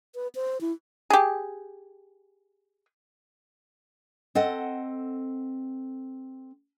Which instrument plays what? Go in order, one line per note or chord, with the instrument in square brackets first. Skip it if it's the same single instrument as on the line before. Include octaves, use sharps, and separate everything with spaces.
[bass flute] B4
C5
E4
[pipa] G4 G#4
[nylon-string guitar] C4 A4 D#5 F#5